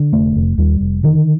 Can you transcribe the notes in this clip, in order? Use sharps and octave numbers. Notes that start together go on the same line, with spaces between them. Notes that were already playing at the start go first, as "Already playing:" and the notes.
Already playing: D3
F1 A3
F1
D#2 G3
F1
D3 D#3